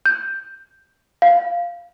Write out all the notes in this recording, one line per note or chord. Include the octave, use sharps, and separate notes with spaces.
G6
F5